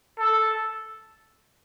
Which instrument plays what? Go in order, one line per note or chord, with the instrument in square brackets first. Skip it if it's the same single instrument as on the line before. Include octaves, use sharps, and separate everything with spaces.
[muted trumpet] A4